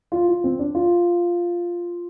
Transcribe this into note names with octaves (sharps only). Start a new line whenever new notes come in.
F4
F4
C4
D4
F4